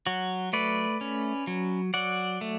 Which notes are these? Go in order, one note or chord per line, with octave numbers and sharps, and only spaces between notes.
F#3 F#4
A3 B4 D5
C#4
F#3
F#3 D5 F#5
A3